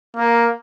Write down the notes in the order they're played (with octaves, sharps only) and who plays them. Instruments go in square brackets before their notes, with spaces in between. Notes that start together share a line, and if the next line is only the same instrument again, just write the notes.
[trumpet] A#3